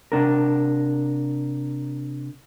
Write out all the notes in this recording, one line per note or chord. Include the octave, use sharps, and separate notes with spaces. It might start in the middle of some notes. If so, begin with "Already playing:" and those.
C3 D4 A#4